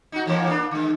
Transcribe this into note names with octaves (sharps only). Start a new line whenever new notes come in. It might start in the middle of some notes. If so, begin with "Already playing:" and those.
D#4 F#4
F2 E3 A#3
A#3 D4
D3 G#3